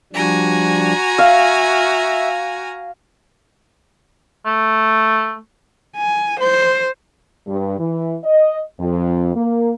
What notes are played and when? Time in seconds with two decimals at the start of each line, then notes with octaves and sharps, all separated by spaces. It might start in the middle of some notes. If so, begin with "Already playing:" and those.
0.13 F3 G3 D4 F#4 G#5 A#5
1.19 E5 F5
4.45 A3
5.96 G#5
6.40 C5
7.47 G2
7.79 E3
8.24 D#5
8.79 F2
9.34 A#3